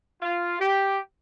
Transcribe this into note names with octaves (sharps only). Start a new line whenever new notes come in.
F4
G4